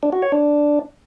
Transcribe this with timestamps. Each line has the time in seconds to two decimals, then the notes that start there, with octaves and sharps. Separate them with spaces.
0.03 D4
0.13 F#4
0.22 C#5
0.32 D4